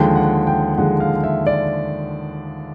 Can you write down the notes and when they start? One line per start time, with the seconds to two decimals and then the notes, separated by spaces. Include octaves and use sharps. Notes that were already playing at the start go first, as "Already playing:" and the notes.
Already playing: D#2 D3 F3 G#3 G5
0.15 F#5
0.47 G5
0.77 D#2 D3 F3 G#3 F#5
1.00 F5
1.24 E5
1.47 D5